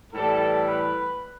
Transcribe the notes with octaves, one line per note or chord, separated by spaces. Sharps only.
A2 E3 G3 A4
B4